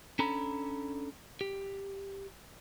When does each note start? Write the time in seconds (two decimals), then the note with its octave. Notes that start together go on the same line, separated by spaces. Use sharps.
0.19 C#4 D4 A4 A#5 B5
1.41 G4